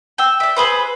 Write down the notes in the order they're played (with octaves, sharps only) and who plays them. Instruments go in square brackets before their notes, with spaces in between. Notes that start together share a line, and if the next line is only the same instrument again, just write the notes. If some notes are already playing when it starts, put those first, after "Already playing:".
[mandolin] G5 E6
D5 E5
G#4 B4 C5